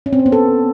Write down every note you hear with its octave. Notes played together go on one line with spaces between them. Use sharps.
C#4
C4
C#4
B3
A4